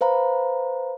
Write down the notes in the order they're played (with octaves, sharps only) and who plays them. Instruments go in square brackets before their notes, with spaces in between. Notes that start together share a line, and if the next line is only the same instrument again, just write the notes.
[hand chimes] B4 C5 F5 A#5 B5